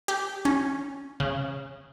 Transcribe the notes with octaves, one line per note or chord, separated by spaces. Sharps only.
G4
C#4
C#3